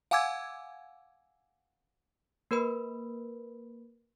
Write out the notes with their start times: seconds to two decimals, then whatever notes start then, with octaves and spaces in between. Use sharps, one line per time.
0.11 F5 F#5 G#5 D6 E6 G#6
2.51 A#3 A#4 B4 B5